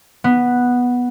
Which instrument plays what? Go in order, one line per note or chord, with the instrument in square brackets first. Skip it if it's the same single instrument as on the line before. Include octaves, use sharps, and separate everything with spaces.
[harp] B3